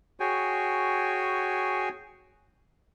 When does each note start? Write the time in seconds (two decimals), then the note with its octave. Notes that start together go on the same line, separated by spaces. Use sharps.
0.20 F#4 G#4 C#5 G5 G#5